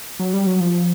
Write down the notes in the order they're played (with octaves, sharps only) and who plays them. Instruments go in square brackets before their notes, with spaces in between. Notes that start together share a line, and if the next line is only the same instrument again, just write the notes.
[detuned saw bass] F#3
G3
F#3
F3